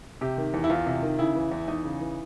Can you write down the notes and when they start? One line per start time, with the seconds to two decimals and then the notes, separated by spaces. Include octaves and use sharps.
0.21 C3 G4
0.38 D#3
0.54 E2
0.64 E4
0.70 E2 F4
0.86 C3
1.02 D#3
1.19 C#3 E4
1.35 E3
1.52 E2
1.68 E2 D#4
1.84 C#3
2.01 E3